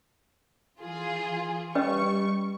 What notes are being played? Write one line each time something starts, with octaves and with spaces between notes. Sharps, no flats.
E3 F4 G#4
G3 C#4 B4 D#5 C#6